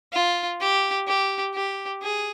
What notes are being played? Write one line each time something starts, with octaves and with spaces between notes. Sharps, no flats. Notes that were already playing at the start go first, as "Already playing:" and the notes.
F4
G4
G4
G4
G#4